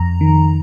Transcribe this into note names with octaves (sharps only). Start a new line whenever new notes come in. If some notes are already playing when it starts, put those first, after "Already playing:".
Already playing: F2 A#5
D#3